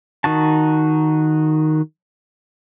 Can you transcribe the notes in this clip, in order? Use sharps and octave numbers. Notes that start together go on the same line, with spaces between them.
D#3 D#4 F#4 A5